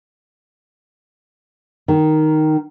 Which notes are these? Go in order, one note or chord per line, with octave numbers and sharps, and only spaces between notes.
D#3